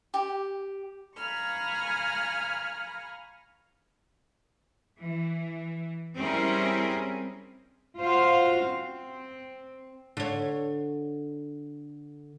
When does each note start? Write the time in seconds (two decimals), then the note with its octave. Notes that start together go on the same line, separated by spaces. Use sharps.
0.14 G4
1.16 F5 G#5 A#5 B5 C#6 F6
4.97 E3
6.17 G3 C4 C#4 E4 G#4 A#4
7.99 F4 F#4 C5 F5
8.65 C4
10.17 D3 C#5